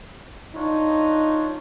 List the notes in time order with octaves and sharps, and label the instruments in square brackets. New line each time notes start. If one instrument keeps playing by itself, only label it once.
[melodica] D4 F4 C#5 [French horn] D#4